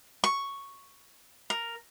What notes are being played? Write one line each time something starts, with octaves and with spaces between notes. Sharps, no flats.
C#6
A#4